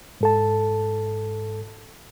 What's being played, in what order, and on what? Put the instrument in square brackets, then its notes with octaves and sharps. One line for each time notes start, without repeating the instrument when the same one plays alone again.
[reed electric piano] G#2 A4 A5